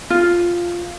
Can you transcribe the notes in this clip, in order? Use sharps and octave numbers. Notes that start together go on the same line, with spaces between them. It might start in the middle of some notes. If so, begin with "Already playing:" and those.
F4